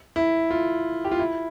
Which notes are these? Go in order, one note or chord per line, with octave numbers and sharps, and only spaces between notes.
E4
F4
G4
F4
E4